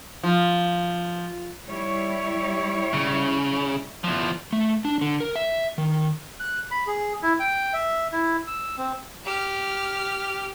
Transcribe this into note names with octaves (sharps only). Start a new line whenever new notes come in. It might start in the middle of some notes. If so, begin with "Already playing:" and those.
F3
G3 E4 C#5
C#3
E2 F3
A3
D4
D3
A#4
E5
D#3
F#6
B5
G#4
E4
G5
E5
E4
E6
C4
G4 F6